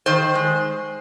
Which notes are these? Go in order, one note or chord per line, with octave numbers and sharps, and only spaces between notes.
D#3 C5
G#3